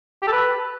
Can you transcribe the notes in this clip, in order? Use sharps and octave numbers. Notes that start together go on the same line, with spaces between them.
G4
A4
B4